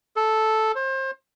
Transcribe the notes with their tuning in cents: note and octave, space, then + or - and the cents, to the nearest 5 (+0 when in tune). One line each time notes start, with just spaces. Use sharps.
A4 -5
C5 +30